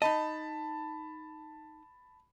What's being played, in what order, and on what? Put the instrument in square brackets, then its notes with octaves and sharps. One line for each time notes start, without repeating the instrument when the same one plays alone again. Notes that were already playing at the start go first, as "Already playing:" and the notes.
[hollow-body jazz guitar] D#4 D#5 [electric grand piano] A5 B5